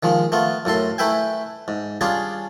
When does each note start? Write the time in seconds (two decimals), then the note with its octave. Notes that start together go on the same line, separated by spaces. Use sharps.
0.03 D#3 F3 G#3
0.32 A3 B3 F4
0.65 F#2 A2 A4 C6
0.98 A3 E4 B4 E5 G5 G#5
1.68 G#2
2.01 G3 C#4 D4 F4 G#4